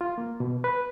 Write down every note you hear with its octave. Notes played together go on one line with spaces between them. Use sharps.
F4
A#3
B2
B4